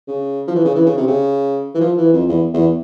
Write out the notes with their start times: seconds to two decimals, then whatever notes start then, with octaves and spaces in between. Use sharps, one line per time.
0.08 C#3
0.48 F3
0.55 E3
0.65 C#3
0.76 E3
0.86 C#3
0.97 C3
1.08 C#3
1.75 E3
1.81 F3
1.97 E3
2.13 F2
2.29 E2
2.54 E2